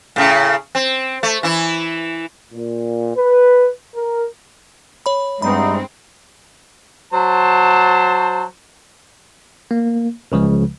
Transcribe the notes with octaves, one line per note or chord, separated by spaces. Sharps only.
A2 C#3
C4
A3
E3 E4
A#2
B4
A#4
C#5 B5
E2 G2 G#3 C4 D#4 B5
F#3 C5 A5
A#3
C#2 C#3 F3 G#3